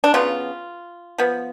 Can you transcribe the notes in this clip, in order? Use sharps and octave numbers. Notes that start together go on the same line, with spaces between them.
D4
C#3 F#3 B3 F4
F3 B3